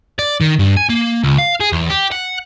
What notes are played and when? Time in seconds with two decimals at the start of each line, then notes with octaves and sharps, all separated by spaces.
0.19 D5
0.41 D#3
0.59 G2
0.77 G#5
0.89 A#3
1.24 C#2
1.39 F5
1.61 G#4
1.72 E2
1.90 G4
2.12 F#5